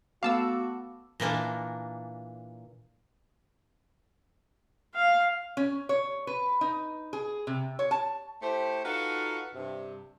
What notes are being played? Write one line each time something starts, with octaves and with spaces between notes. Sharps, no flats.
A3 B3 F#4 F5 A5 D6 E6
A#2 E3 A#3 D4
F5
C#4
C#5
B4
D#4
G#4
C3
C#5
A5
A3 E4 G4 C5
D#4 F4 F#4 A4 B4 F5
G2 C3